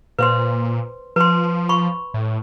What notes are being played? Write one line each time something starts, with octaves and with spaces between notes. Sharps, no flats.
A#2 B4 C5 C6
F3 B4 C6
B5 C#6
A2